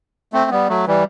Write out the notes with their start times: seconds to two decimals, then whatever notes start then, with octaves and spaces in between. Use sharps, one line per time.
0.33 A3 C4
0.51 G3 B3
0.69 F#3 A3
0.87 E3 G3